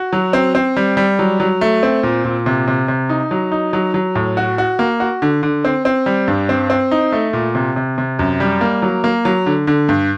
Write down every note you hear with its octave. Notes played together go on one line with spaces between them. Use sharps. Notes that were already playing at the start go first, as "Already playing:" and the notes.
Already playing: F#4
F#3
C4
C4
G3
G3
F#3
F#3
A3
C4
A#2
A#2
C3
C3
C3
D#4
F#3
D#4
F#3
F#3
A2
F#4
F#4
A#3
F#4
D3
D3
C4
C4
G3
G2
C4
C4
D#4
A3
A#2
C3
C3
C3
F#2
G3
A#3
F#3
A#3
F#3
D3
D3
G2